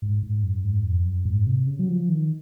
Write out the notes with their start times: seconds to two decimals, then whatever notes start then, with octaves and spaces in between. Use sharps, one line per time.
0.02 G#2
0.23 G#2
0.43 F#2
0.64 G#2
0.84 F2
1.06 F#2
1.25 G#2
1.47 C3
1.67 C#3
1.79 F#3
1.89 F3
2.09 D#3